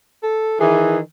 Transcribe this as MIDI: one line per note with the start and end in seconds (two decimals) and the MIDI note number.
0.23 0.59 69
0.60 0.98 51
0.60 0.98 52
0.60 0.97 68